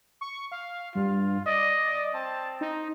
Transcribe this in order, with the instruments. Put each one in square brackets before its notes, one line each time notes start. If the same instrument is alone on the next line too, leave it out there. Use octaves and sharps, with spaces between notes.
[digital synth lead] C#6
F5
[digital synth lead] G2 [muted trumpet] F4
[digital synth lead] D5 [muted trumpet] D#5
[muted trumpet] C4 [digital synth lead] A5
[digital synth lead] D#4